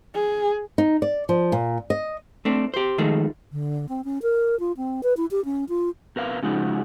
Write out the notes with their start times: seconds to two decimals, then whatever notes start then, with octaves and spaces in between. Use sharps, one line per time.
0.14 G#4
0.78 D#4
1.02 D5
1.29 F3
1.52 A#2
1.90 D#5
2.45 A3 C4 D4
2.74 G4 C5
2.98 D#3 F3 G#3 A3
3.52 D3
3.89 C4
4.05 C#4
4.22 A#4
4.60 F4
4.77 C4
5.03 B4
5.17 E4
5.31 G4
5.45 C#4
5.69 F4
6.16 B2 A#4 B4 F5
6.42 C#3 F3 G#3 D#4 F#4